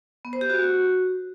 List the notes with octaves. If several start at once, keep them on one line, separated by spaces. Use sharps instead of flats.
B3
C5
G4
F#4